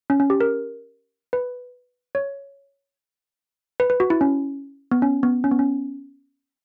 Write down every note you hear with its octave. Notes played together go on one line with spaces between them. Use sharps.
C#4
C#4
G4
A#4
B4
C#5
B4
B4
F#4
E4
C#4
B3
C#4
B3
C#4
B3
C#4